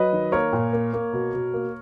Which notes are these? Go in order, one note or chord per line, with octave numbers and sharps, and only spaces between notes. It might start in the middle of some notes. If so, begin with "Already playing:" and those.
Already playing: F#3 B4 D#5
D#3
A#3 A#4 C#5
A#2
A#3
A#3
B2
B2
A#3